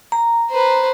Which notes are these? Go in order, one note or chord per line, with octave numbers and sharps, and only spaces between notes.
A#5
B4 C5